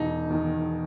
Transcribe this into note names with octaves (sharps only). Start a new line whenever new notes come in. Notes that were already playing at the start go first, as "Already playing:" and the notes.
Already playing: E1 D#4
E2 D#3